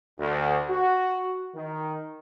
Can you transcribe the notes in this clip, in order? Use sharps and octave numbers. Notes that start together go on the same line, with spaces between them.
D2
F#4
D#3